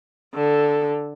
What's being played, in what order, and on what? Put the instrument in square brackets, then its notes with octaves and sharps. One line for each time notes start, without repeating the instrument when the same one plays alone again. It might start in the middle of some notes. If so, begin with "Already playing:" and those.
[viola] D3 A4